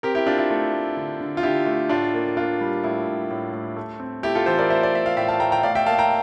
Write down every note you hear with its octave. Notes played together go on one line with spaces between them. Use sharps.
C4 G4 A#4
E4 G4
C4 D4 F4
E4
A3
A3
D3
D3
F4
D3 E4 G4
A3
A2 D4 F4
A#3
A#3 D4 F4
G3
A2 E4
A2
A2
A2
A3
C4
A3 E4 G4
F4 A4
E3 A4 C5
A#4 D5
A3 C5 E5
D5
A3 E5
F5
A2 E5 G5
F5 A5
A3 G5 A#5
G5 A#5
A2 D5 F5
E5 G5
A#3 F5 A5
G5 A#5